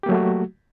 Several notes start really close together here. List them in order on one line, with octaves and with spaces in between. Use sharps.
G4 A#3 F#3 A3 F#4